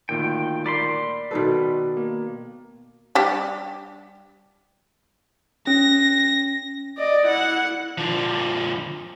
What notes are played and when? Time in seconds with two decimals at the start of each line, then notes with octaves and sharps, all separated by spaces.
0.09 D2 A#2 D#3 G5
0.66 A#3 D5 B5 C6
1.31 B2 D#3 A4 B4
1.97 A#3
3.15 G3 D4 G4
5.67 C#4 A#6
6.98 D5 D#5
7.26 E4 F#5
7.98 D3 F3